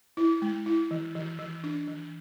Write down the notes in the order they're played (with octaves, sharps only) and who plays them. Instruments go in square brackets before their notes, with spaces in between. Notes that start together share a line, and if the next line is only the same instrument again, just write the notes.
[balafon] E4
G#3
E4
E3
E3
E3
D4
E3